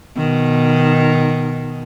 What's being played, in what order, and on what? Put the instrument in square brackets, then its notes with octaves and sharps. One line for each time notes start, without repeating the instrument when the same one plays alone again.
[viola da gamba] B2 D#3